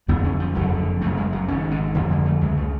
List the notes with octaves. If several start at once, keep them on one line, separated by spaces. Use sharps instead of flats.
F#1 F2 D3 B3
C#4
F3
F#1 F2 D3 F#3
F#1 F#2 C#3 A3
G#3
F#3
G#1 G#2 C#4
D3
F#1 F2 D3 F3
G#3
A3
C#2 C#3 G#3
A3